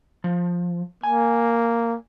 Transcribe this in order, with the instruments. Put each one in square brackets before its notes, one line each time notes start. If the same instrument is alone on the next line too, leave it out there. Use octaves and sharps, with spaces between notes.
[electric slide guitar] F3
[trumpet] A#3 [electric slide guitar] G#5